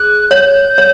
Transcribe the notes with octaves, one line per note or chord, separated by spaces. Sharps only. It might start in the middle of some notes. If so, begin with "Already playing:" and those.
Already playing: G#4 F#6
C#5 G6
C#5